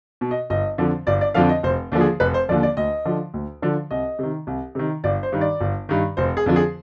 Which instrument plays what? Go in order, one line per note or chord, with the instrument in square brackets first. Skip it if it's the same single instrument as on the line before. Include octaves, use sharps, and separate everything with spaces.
[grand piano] B2
D#5
G1 D#5
F2 D3 F3
G1 D5
D5
F2 D3 F3 F5
D#5
F1 C5
D#2 D3 F3
G#4
F1 B4
C5
D#2 D3 F3 D5
D5
D2 D#5
D3 F3
D2
D3 F3
C2 D#5
C3 D#3
C2
C3 D#3
G1 D5
C5
G2 D#3
D5
G1
G2 D#3
F1 C5
G#4
F2 D3 F3
G#4